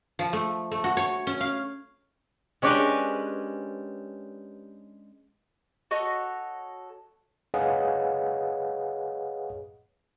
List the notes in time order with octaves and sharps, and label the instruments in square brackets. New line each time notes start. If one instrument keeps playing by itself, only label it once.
[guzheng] F3
A3
A3
F#4
C#5
C#4
F5
[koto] G#3 C#4 D4 G4 A#4 B4
[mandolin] F#4 A4 C#5 D#5
[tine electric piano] G#4 B4 C#5 D#5 F5 F#5